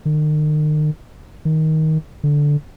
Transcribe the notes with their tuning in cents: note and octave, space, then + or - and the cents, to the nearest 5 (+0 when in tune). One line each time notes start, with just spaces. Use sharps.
D#3 -40
D#3 +15
D3 -5